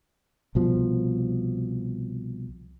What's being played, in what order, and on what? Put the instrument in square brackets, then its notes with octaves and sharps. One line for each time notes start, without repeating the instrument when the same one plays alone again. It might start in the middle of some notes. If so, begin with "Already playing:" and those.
[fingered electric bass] C2 B2 F3